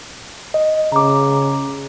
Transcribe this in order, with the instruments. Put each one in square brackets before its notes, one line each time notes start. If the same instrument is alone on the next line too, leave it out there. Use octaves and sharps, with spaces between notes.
[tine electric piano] D#5
[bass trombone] C#3 [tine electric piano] A#5 D6